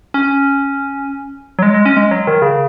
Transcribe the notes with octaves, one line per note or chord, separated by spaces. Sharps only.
C#4
F#3
G#3
G#3
C#4
G#3
F#3
D#3
C#3